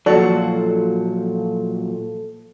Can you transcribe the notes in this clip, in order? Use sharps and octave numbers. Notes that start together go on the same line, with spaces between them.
A#2 F3 F#3 F#4 A4 D5